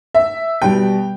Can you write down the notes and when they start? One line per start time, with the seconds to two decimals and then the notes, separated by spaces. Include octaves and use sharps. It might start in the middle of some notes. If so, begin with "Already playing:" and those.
0.14 E5
0.62 B2 G3 G5